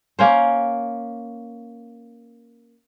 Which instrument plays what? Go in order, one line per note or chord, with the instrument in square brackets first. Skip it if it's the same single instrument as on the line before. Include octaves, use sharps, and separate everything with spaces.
[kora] A#3 C#4 C5